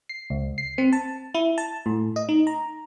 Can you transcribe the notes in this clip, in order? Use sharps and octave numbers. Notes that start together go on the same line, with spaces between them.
C7
C#2
C7
C4
A5
E4
A5
A2
D#5
D#4
A#5